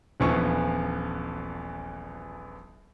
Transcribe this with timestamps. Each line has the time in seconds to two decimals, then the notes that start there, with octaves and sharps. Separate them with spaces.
0.20 D#1 A#1 E3 F3 B3 C#6